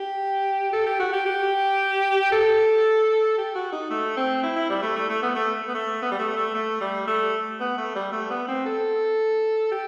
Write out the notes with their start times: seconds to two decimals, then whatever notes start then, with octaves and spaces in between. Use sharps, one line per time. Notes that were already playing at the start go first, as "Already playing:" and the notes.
Already playing: G4
0.73 A4
0.86 G4
1.00 F#4
1.13 G4
1.26 G4
2.32 A4
3.38 G4
3.55 F#4
3.73 D#4
3.90 A3
4.17 C4
4.43 E4
4.56 E4
4.70 G3
4.83 A3
4.96 A3
5.10 A3
5.23 B3
5.35 A3
5.68 B3
5.75 A3
6.02 B3
6.12 G3
6.20 A3
6.37 A3
6.54 A3
6.81 G3
7.08 A3
7.60 B3
7.78 A3
7.96 G3
8.13 A3
8.31 B3
8.48 C4
8.66 A4
9.72 G4